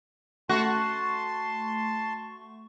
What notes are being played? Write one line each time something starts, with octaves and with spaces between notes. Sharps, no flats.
A3 F#4 A5 C6 C#6